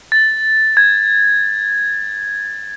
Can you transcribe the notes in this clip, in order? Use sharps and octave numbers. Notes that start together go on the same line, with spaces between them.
A6
G#6